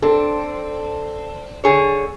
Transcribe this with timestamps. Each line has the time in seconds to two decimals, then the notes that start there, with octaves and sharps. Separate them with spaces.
0.02 C4 D4 A4
1.64 D3 G#4 C#5